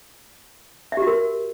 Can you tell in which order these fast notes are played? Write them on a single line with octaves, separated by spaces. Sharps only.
E5 G4 F#4 A#4